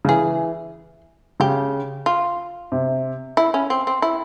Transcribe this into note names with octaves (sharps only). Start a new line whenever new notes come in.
C#3
E3 G#4
C#3 G4
F4
C3
E4
C#4
C4
C4
E4